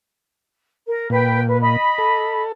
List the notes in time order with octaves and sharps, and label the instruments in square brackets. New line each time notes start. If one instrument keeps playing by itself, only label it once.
[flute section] A#4
[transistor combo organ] A#2 [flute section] B4 G5
[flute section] B4
D#5 B5
[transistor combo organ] A4